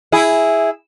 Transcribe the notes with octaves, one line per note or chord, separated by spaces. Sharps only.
E4 G#4